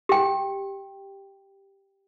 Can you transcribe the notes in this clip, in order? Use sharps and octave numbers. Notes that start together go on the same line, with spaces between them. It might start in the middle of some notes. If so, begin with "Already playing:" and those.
G4 G5